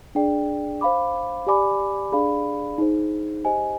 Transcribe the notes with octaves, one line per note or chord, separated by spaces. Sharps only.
D4 G#4 D5 G5
C5 F5 B5 D6
G4 D5 G#5 B5 D6
D4 G#4 D5 F5 B5
D#4 G#4 C5
G4 C5 D#5 G#5